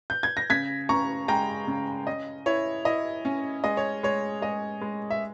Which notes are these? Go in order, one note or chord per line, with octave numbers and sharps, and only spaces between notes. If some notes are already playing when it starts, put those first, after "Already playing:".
G6
G#6
A#6
C#3 G#6 B6
C#3 A#5 C#6
G#3 G5 A#5
C#3
C#4 D#5
E4 C#5
E4 D#5
C#4
G#3 D#5
C#5
G#3 C#5
G#3 D#5
G#3
E5